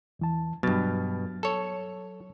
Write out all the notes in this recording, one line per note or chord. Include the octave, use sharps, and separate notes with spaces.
E2 E3 A5
G2 B2 F#3 F6 A6
A4 C#5